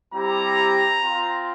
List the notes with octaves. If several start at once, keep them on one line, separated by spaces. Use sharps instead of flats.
G3 C4 E4 G4 A#5
C4 F4